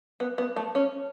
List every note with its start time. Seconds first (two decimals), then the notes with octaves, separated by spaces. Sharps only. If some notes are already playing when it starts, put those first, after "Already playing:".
0.20 B3
0.38 B3
0.56 A3
0.75 C#4